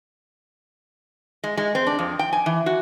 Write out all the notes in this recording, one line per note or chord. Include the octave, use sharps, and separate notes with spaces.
G#3
G#3
C4
D4
F2
G5
G#5
E3
F#4